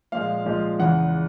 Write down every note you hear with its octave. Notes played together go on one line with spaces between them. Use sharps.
A#2 F3 G#3 F5
A#2 F3 G#3
E2 C#3 E3 F#5